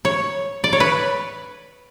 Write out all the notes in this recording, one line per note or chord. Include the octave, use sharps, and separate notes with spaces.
C#5
D5
C#5
B4